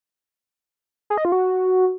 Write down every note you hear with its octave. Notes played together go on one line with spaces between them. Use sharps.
G#4
D#5
F4
F#4